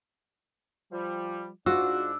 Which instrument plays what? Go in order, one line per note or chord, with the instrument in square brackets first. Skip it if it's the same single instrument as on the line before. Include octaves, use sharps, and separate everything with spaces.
[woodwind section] F3 G3
[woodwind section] G#2 D4 [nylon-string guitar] F4 [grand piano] F#4 [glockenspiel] E6